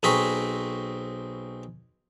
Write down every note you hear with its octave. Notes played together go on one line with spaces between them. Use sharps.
B1 C4 G#4 A#5 B5 C#6